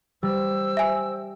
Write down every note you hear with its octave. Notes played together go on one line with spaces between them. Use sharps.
G3 C5 E6
E5 G#5